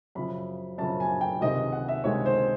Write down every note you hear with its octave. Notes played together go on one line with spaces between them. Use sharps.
F#2 C#3 F3 B5
F#2 C#3 F3 A5
G#5
G5
C#2 C3 D#3 G#3 D#5
F#5
E5
C#2 C3 D#3 G#3 C#5
C5